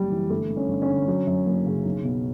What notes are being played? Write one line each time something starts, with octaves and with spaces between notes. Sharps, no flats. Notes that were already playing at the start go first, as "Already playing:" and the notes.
Already playing: F#1 F#2 G3
E3
G1 A3
G2
C#4
G1
C#4
D3
F#3
F#2
F#1
C#3
B1
B2